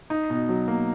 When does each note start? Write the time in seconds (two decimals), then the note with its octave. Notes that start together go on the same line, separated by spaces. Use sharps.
0.10 D#4
0.30 B2
0.49 F#3
0.68 A#3